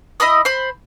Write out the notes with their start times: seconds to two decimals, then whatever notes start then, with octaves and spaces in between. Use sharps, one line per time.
0.20 E4 D#5 B5 D#6
0.45 C5 B5